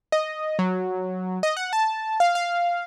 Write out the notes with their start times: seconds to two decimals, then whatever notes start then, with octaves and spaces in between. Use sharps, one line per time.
0.12 D#5
0.59 F#3
1.43 D#5
1.57 F#5
1.73 A5
2.20 F5
2.35 F5